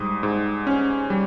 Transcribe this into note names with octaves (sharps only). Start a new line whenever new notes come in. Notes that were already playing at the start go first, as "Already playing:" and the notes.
Already playing: G#2 G3 D#6
G#2
C#4
G3